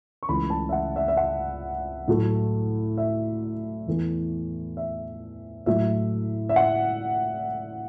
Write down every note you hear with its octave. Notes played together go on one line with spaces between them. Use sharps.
C#6
C#2 C#3 E3 A3 B5
A5
E5
F#5
E5
E5
F#5
A2 F#3 A3
E5
E2 E3 A3
E5
A2 F#3 A3 E5
E5
F#5